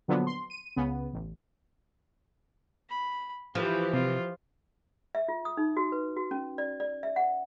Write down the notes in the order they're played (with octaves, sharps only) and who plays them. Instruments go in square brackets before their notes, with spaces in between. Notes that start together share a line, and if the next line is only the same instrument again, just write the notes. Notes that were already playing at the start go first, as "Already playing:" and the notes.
[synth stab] A#2 D3 F3 F#3 B3 D4
C6
D#7
C#2 C#3 B3
A1
[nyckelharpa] B5
[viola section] E3 G4 [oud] F3 [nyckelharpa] B4
[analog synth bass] C3 [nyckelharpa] F4
[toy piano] E5
F4
D#6
D#4
F#4
B4
F#4
C#4
D5
D5
E5
F#5